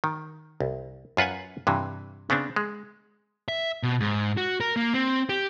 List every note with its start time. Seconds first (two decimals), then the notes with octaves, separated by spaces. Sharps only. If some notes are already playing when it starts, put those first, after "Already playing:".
0.04 D#3
0.60 C2
1.17 F#2 F4 B4 F#5 G#5
1.67 G2 C3 E3
2.30 C#3 B3 C4 D4
2.56 G#3
3.48 E5
3.83 B2
4.00 G#2
4.37 F#4
4.60 A#4
4.77 A#3
4.94 C4
5.29 G4